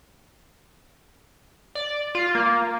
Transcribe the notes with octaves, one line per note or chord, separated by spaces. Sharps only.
D5
F4
A#3